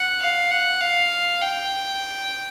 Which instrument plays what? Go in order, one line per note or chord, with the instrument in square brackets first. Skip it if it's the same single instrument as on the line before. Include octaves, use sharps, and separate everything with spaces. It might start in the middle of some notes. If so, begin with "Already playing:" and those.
Already playing: [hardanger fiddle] F#5
F5
F#5
F5
G5